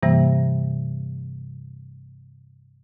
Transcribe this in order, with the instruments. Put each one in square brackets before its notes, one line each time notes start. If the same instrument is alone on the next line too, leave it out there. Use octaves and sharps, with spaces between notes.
[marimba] G2 C3 E3 G3 A#3